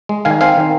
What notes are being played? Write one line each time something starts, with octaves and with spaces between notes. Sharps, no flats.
G#3
D#3 F5 G#5
C4 F5 G#5
D#3